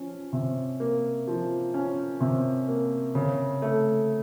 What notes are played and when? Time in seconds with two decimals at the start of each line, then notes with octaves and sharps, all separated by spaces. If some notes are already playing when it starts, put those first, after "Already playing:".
Already playing: F3 C#4
0.33 C3
0.80 A#3
1.27 F3
1.74 C#4
2.21 C3
2.68 A#3
3.15 C#3
3.62 A3